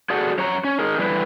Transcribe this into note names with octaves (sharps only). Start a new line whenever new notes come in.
F#4 G#4 A4 D5 F#5
F#2 C#5 A#5
C#4
D#4 G#4 A#4
D3 G3 E4 B4